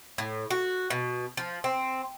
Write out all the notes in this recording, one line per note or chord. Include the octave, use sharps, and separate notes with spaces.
A2
F#4
B2
F3
C4